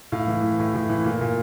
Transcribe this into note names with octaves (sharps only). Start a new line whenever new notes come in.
A2 F5
E3
E3
A2
A2
E3
A#2
A#2